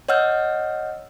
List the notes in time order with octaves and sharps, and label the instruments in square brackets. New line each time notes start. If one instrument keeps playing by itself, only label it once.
[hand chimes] C#5 D#5 F#5 E6 F6 G6